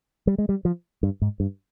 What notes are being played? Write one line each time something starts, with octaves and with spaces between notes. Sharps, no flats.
G3
G#3
G3
F3
G2
G#2
G2